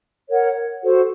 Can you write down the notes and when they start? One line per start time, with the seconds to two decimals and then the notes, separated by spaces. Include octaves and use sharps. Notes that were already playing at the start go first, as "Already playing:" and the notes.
0.30 A#4 C#5 F#5
0.83 F#4 A4 C5